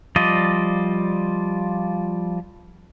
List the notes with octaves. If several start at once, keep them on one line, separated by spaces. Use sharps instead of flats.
F3 G3 F4 D5 D#5